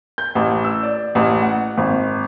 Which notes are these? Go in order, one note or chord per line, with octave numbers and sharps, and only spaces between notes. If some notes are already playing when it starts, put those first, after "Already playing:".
G6
A1
E6
D5
A1
F#5
G#1